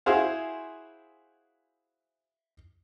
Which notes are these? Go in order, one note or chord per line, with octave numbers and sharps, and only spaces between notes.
E4 F#4 G#4 C5 F5